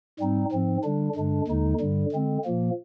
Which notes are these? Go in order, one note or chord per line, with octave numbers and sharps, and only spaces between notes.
G#2 G3 C4 D#4
G#2 F3 C4
D3 G3 D4
G2 D3 G#3 D4
D#2 D3 G#3 D#4
G2 D3 G3
D3 G#3 C4
A#2 F3 A#3